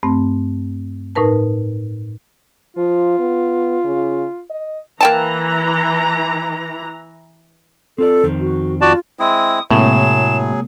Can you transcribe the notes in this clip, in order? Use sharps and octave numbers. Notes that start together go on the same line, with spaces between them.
G2 A3 C4
A2 D#4 A#4 B4 A5
F3 F4
B3
C#3
D#5
E3 A#3 G5 A5 A#5
C4 F4 A4 D5
F2 D#3 C4
F#4
F4 F#4 D5 A5
G#3 C4 E4 D#6
A2 C3 F#3 G#3 A#3 G#4 E7